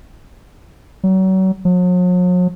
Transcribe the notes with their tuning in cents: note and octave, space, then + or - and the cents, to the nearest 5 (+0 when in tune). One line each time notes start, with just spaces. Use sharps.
F#3 +35
F#3 -45